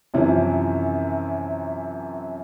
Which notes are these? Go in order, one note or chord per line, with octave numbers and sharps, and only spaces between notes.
F#2 C3 E3 F3 C#4